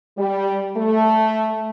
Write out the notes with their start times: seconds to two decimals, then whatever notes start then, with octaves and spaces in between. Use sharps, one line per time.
0.18 G3
0.77 A3